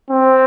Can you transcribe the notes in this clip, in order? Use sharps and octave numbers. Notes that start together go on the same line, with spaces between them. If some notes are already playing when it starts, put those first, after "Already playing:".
C4